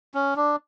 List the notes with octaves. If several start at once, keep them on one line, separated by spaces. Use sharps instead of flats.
C#4
D4